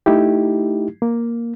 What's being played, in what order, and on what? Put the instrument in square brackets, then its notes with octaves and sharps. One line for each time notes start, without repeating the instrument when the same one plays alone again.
[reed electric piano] A3 D#4 E4 G4
A#3